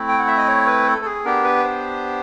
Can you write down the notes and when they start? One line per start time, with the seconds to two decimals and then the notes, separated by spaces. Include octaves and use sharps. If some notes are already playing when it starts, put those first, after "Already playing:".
Already playing: A3 C4 E4
0.09 G5
0.19 F#5
0.28 E5
0.38 D#5
0.47 C#5
0.67 B4
0.86 A4
1.02 A4
1.05 G#4
1.25 B3 D4 G4 A#4
1.44 B4
1.64 C5